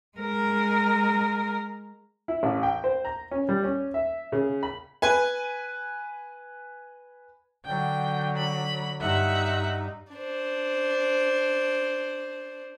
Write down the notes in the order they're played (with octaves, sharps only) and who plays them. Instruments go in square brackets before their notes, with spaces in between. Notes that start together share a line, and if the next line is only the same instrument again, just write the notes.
[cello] G#3 A#4
[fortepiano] E4
A1
G5
C5
A#5
C#4
G3
C#4
E5
C#3
B5
[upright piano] B4 G#5
[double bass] D3 F#3 [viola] G5
[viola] B5
[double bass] G2 D#4 [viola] E5 F#5
[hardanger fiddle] D4 C5